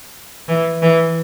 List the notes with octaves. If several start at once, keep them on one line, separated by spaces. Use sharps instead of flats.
E3
E3